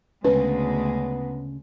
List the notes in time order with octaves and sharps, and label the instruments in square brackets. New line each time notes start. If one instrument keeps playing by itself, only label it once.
[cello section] D2 G#3 [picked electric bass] C#3 C#4 [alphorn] B3 [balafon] B4